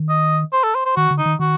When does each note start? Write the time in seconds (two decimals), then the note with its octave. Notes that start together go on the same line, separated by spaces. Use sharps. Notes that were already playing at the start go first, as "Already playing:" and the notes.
Already playing: D#3
0.09 D#5
0.52 C5
0.64 A4
0.75 C5
0.86 C5
0.96 D#3 F#4
1.11 D3
1.18 D#4
1.26 D#3
1.40 D#3 F#4